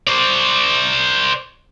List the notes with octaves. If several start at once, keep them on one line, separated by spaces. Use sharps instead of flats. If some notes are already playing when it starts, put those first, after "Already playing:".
C5 D5